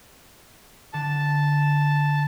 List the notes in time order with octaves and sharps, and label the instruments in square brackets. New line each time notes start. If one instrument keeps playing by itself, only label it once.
[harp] D3 [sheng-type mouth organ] A5